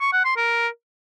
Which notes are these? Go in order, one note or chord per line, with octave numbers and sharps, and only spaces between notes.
C#6
F#5
C6
A#4